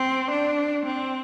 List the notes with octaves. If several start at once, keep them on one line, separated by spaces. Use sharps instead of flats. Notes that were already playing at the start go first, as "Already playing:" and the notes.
Already playing: C4
D4
C4